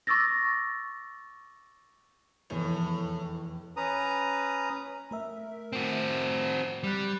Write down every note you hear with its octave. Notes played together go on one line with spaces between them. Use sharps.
C#6 D6 E6 A6 A#6
F1 E2 A2
C#4 B4 A#5 D#6
A3 A#4 E5
C4 F#4
G3 B5 F#6